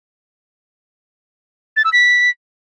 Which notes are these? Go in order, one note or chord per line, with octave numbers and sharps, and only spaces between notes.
A6
E6
B6